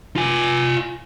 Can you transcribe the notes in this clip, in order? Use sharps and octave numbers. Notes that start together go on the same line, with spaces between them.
F4 G#5